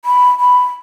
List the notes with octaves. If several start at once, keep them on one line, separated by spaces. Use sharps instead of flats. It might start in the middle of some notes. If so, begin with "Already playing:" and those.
B5
B5